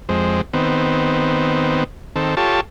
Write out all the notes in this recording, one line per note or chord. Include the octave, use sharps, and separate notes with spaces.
F2 G#3 C4
D#3 B3 C4
D#3 C4 A4
F4 G4 A4 C#5 A5